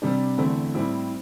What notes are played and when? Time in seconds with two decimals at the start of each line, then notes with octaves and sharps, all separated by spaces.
0.02 C3 G3 D4
0.38 E2 D3 A3 C4 E4
0.75 A2 G3 C4 E4